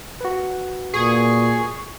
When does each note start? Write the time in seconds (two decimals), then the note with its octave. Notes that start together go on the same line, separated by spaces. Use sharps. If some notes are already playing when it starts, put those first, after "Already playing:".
0.21 F#4 B4
0.93 A#2 G#4 C#6